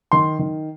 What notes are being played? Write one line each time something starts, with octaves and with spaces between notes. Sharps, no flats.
D#3 C6
D#3